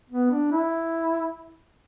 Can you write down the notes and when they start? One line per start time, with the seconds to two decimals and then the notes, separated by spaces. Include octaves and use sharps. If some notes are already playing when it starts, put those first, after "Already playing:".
0.10 B3
0.31 D4
0.52 E4